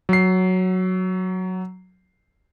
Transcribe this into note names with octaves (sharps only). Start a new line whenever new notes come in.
F#3 C7